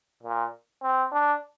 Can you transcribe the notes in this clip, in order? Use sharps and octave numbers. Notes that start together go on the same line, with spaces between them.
A#2
C4
D4